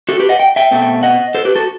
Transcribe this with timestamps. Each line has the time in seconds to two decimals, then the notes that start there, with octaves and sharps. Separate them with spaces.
0.09 F#4 A4
0.20 G4 B4
0.29 D#5 F#5
0.40 G5
0.56 E5 G5
0.71 B2 A3 C4
1.03 D#5 F#5
1.35 A4 C5
1.45 G4 B4
1.55 F#4 A4